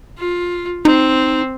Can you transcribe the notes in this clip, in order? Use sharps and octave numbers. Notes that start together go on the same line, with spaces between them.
F4
C4 D#4